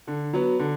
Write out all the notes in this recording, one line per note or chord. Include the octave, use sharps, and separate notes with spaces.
D3
F#3 B3
D3